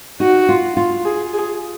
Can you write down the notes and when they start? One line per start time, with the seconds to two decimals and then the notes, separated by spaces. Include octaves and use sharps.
0.20 D#4 F#4
0.49 F4
0.77 F4
1.05 G#4
1.34 G#4